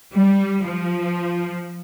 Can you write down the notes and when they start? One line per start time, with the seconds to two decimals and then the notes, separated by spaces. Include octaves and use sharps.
0.13 G3
0.64 F3